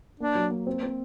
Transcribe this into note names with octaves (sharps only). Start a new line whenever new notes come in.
A#3 D4
F#3
A#3
C4
C4